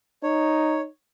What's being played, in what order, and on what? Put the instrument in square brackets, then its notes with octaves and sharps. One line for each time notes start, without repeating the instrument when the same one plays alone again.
[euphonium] D#4 [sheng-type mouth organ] C#5